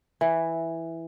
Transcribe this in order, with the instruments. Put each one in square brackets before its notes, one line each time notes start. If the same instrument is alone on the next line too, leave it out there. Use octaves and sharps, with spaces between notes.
[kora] E3